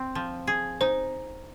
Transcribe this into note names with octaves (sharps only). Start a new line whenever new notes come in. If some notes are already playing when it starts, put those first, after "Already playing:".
Already playing: C4
F3
G#4
D#4 C5